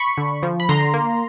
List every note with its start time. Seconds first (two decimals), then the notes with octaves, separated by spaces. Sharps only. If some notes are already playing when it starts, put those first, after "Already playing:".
Already playing: B5 C#6
0.18 D3
0.43 F3
0.60 B5
0.69 D3 A#5 C6
0.94 A#3